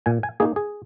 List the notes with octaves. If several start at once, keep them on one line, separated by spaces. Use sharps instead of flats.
A#2 G#5
G#5
A#3 D#4 G#4
G#4